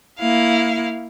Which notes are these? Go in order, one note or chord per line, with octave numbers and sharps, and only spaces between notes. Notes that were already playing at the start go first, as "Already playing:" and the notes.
A#3 E4 F5